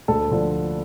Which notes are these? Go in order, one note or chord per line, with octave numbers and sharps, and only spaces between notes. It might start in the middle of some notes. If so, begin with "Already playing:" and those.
D2 A4
D3 F3